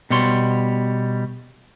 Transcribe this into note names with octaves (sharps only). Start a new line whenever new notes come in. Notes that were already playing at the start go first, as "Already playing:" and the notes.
B2 G3 C#5 C6